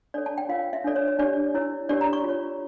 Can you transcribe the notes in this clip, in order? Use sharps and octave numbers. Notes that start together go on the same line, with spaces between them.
D4 A4 C#5 D5
A5
G5
F4 A#4 C#5 F5
E5
D4 A4 C#5 D5
C#5
C#5
D4 G4 C#5 D5
E4 A#4 C#5
D4 G4 A#4 C#5 D5
A#5
C#6
F4 C#5